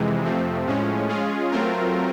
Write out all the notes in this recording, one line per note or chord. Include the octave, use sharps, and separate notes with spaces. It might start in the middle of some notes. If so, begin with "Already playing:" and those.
Already playing: F2 C3 E3 G#3
F2 C3 F3 A3 C4
A2 F3 G#3 C#4
G#3 C#4 F4 G#4
F#3 A3 C4 F4 A#4